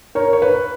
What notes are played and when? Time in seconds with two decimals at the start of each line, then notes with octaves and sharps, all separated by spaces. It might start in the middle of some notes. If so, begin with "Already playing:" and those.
0.15 A#4 C#5
0.33 C#5
0.42 B4